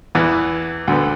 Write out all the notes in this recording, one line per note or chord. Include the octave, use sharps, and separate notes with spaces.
E2 E3 B3
D2 D3 B3